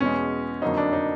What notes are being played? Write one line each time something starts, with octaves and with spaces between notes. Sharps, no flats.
E2 B2 G#3 C#4
F2 D3 F#3 A#3 D#4
D4
D#4